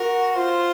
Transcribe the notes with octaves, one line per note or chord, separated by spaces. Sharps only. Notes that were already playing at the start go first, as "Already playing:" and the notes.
Already playing: F#4 A#4
F4 C5